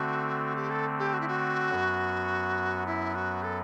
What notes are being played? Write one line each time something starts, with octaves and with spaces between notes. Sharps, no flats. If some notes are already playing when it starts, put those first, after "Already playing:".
Already playing: D3 A3 C4 F#4
G4
A4
G4
F#4
E4
F#4
F#2 F#3 B3
E4
F#4
A4